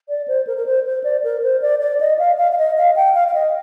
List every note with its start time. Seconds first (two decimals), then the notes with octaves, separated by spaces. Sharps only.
0.09 D5
0.28 C5
0.47 A#4
0.57 A#4
0.66 C5
0.86 C5
1.04 D5
1.24 A#4
1.43 C5
1.62 D5
1.81 D5
2.00 D#5
2.19 F5
2.38 F5
2.52 F5
2.58 D#5
2.78 F5
2.96 G5
3.15 F5
3.28 F5
3.34 D#5